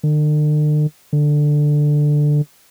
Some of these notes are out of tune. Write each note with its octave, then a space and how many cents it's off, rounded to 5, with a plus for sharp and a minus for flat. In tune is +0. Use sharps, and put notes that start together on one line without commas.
D3 +45
D3 +10